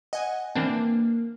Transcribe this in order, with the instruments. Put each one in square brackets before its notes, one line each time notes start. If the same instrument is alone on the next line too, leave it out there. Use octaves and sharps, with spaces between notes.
[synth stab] D#5 G#5 [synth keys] F#5
[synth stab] E3 C4 D4 [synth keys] A#3